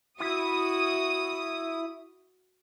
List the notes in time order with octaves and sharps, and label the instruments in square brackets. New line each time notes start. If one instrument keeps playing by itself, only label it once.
[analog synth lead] E4 [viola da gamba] F#4 [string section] D#6